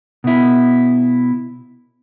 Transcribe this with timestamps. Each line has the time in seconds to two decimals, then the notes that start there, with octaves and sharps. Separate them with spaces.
0.24 B2 E4